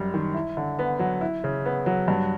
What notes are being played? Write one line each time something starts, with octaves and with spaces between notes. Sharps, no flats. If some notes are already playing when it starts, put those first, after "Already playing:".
Already playing: F#2 G3
D#3
E4
D3
B3
F#3
E4
C#3
B3
F#3
G2